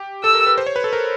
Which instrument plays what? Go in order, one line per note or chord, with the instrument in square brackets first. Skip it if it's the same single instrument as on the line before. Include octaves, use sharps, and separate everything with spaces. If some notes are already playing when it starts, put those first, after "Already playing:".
Already playing: [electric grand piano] G4
[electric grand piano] A4 [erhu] E6
[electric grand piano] A#4
B4
C5
C#5
B4
A4
A#4